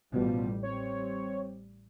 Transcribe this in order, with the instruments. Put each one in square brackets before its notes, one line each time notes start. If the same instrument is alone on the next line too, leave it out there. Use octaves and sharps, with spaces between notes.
[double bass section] A1 G3 [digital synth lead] B2 [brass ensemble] F3 F4
[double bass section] G3 [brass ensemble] C4 [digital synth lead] C#5